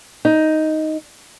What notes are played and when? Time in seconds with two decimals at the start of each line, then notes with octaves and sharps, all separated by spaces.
0.25 D#4